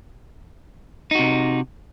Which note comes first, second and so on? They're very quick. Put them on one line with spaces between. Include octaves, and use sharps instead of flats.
D#4 F#4 C3